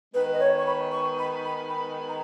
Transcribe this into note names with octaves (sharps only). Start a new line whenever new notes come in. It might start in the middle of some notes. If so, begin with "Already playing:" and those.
D#3 G#3 B3 B4
D#5
C#5
C#6
B5
C#6
B5
B5
B5
A#5